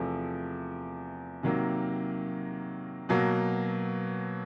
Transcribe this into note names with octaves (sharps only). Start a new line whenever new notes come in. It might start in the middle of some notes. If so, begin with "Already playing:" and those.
Already playing: E2 C3 F3 A3
C3 D#3 F#3 A#3
B2 F#3 A#3